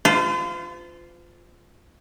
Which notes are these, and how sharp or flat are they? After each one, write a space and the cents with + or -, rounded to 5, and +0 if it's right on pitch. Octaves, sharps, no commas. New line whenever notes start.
F4 +0 C5 -40